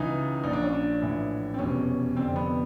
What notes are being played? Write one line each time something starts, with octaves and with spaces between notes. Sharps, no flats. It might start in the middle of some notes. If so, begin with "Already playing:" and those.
Already playing: C#2 C#3 E3 D#4
A#1 A#2 D#4
D4
C#4
D4
A#1 A2 E3
C4
F1 E2 B2 C#4
F1 F2 D3 C4
B3